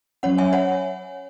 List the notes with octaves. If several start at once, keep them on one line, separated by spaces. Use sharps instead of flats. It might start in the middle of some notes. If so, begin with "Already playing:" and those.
F#3 C#4 C#5 F#5
E5 G#5
C#5 F#5